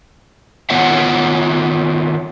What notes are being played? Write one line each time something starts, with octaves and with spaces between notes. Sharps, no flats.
D#3 B3 F4 C#5 E5 F#5